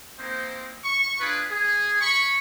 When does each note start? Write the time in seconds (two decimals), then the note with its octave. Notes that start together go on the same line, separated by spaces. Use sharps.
0.19 A#3 C4 D#4 C5
0.84 C#6
1.20 D4 F4 G#4 B4
1.50 G#4
2.01 G#5 B5 C#6